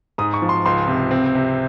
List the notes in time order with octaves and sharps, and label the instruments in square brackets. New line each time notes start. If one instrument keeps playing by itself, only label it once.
[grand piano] G#2 D#6
C#6
F3
C6
C#2 C6
C3
C4
C3